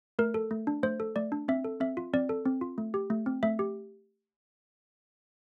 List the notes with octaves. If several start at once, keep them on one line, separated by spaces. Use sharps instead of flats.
A3 A#4
A4
A3
D4
A3 C5
A4
A3 D5
D4
C4 E5
A4
C4 E5
F4
C4 D5
A4
C4
F4
A3
G4
A3
C4
A3 E5
G4